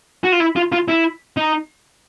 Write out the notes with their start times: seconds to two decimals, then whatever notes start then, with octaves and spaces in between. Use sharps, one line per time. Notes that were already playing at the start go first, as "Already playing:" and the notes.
0.24 F#4
0.32 F4
0.40 E4
0.56 F4
0.72 F4
0.88 E4
1.37 D#4